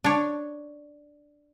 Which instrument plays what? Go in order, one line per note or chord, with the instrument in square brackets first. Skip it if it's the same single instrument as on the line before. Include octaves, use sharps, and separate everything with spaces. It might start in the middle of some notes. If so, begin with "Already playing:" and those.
[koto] D4 C#5